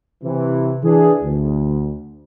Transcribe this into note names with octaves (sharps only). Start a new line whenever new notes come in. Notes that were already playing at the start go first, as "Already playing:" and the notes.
C3 E3
E3 D4 G#4
D2